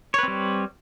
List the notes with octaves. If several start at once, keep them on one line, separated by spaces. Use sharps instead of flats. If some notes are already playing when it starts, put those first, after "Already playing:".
G3 C4 B4 C#5